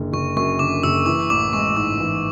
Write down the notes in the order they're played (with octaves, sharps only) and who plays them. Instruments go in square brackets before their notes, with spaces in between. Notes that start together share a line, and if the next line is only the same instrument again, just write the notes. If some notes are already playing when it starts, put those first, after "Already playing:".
Already playing: [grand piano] F#1 D3
[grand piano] F#1 [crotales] C#6
[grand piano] F#2 [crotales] C#6
[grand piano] D3 [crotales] D6
[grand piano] F#1 [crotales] E6
[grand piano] E3 [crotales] D6
[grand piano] A1 [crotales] D6
[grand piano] G#3 [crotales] C#6
[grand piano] G#2 [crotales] D6
[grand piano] E3